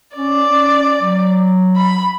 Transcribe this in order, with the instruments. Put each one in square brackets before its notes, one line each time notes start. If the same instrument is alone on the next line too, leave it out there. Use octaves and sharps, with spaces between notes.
[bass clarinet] C#4 [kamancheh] D5
[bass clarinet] C#4
F#3
[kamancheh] B5